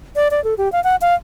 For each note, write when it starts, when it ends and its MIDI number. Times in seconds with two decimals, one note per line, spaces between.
0.16 0.28 74
0.31 0.43 74
0.44 0.54 69
0.58 0.71 67
0.72 0.82 77
0.84 0.96 78
1.02 1.15 77